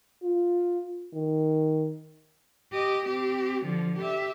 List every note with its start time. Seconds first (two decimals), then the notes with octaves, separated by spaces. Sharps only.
0.23 F4
1.13 D#3
2.72 G4 D#5
3.06 C4 G4
3.64 D3 F3
3.98 G4 E5